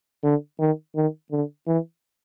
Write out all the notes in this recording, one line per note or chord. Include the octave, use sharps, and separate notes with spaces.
D3
D#3
D#3
D3
E3